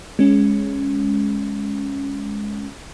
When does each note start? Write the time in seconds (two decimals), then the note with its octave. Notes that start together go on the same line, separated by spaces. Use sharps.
0.19 G#3 C#4